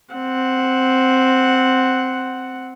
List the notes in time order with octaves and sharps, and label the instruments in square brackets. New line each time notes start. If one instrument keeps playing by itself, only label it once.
[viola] C4 F#5